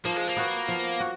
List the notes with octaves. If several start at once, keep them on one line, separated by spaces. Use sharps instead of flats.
F3 A#3
G#3
A#3
B3 F#4
F3
F#4